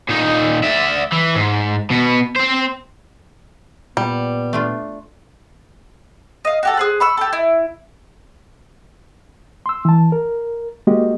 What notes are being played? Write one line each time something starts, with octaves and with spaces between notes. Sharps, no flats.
A#2 D#4
D5 E5
E3
G#2
B2 B3
C4 C5
A#2 G3 B3
A3 D4 F4
D#5 F5
F#4 G4 A4
G#4 C5 F#6
B5 C#6 E6
G4 A4
E4
C6 E6
E3 A5
A#4
G#3 A#3 F#4 G4 D#5